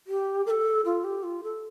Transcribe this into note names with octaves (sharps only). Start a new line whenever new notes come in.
G4
A#4
A4
F4
G4
F4
A4